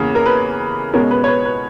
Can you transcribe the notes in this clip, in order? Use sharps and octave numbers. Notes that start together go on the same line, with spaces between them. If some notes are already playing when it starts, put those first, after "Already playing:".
Already playing: E2 C#3 E3 A#3
A#4
B4
B2 G#3 C#4 A#4
B4
C#5
B4
B4